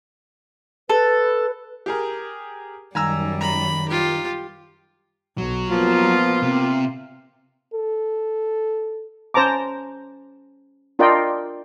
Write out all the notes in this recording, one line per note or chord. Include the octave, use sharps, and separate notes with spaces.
A4 B4
G4 G#4 A#4
F#2 D#3 G3 G#5 A#5 E6
A#5 B5
F4 G4
B1 F#3
F3 A#3 B3 F4
C3
A4
C#4 C5 A5 A#5 D6
D4 F4 A#4 D5 D#5 G5